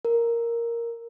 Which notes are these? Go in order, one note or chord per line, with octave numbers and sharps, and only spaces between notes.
A#4